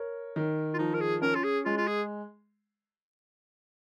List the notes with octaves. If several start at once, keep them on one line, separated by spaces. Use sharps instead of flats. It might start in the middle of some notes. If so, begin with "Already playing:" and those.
Already playing: A#4 C#5
D#3
F4
F3 D#4
A#4
G#4
C#4 A#4
F4
G#4
G#3 F4
F4
G#4